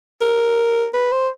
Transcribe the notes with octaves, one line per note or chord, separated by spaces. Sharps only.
A#4
B4
C5